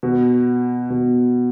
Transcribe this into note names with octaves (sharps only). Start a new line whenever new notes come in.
B2
B2